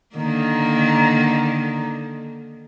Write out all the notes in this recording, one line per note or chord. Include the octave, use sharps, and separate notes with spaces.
D3 D#3 A#3